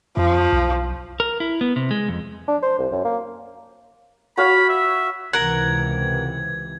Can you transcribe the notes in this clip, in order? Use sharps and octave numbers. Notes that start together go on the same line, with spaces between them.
F2 F3
B1
A#4
E4
B3
C3
G#3
F2
D4
C5
C2
F#2
A#3
F#4 C#5 F5 B5
E5
C#2 C3 E3 A#4 F#5 G#6